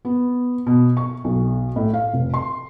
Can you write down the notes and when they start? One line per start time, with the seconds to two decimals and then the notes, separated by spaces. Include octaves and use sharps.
0.05 B3
0.67 B2
0.97 C#6
1.24 B1
1.76 A2
1.94 F5
2.14 F1
2.34 C6